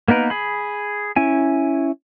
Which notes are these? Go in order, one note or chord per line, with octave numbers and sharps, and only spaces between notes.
A#3 B3 D#4 A#4 B4
G#4 B5
C#4 E4 G#5